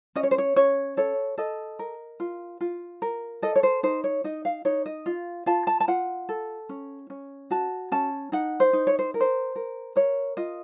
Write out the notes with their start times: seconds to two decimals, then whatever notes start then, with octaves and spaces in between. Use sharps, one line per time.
0.16 C#4 D#5
0.23 C#5
0.31 C5
0.38 C#5
0.56 C#4 C#5
0.97 A4 C#5
1.38 A4 D#5
1.79 A#4
2.20 F4
2.61 F4
3.02 A#4
3.42 A4 D#5
3.56 C#5
3.63 C5
3.83 D#4 C5
4.04 C#5
4.24 D#4 D#5
4.45 F5
4.65 D#4 C#5
4.86 D#5
5.06 F4
5.46 F4 A5
5.67 A5
5.80 A5
5.88 F4 F#5
6.29 A4
6.69 C#4
7.10 C#4
7.51 F#4 A5
7.92 C#4 A5
8.32 D#4 F#5
8.60 C5
8.73 D#4
8.87 C#5
8.99 C5
9.14 A#4
9.20 C5
9.56 A#4
9.96 A#4 C#5
10.37 F4 D#5